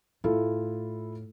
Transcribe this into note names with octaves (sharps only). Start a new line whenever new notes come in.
A2 E4 F4 A4